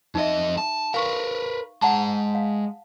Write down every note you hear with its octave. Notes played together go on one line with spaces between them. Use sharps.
F2 D#4 D#5 E5
A5
A#4 B4 F5 C#6
G#3 F#5 A5 A#5
F5